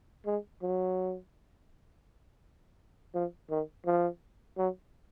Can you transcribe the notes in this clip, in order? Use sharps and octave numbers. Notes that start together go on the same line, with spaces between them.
G#3
F#3
F3
D#3
F3
F#3